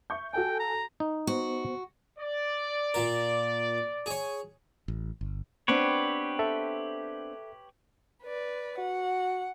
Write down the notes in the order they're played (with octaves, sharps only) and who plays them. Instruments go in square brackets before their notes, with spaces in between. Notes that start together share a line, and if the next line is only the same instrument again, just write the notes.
[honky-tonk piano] E5 C#6 G6
[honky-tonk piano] F#4 A4 G#5 [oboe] G5
[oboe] A#5
[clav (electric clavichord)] D#4
[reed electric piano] B3 C5 [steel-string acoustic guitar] F#4
[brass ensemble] D5
[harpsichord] A#2 A#4
G#4 C#5
[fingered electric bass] A1
G1
[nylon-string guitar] B3 C4 D4 [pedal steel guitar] G4 B4 C#5
[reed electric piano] A4 E5
[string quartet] B4 D5
[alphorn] F#4 [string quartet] F#5